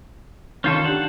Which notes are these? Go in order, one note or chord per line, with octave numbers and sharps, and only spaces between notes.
D#3 C#4 F4 A4 G6 E7
D4 G4 F#5 A5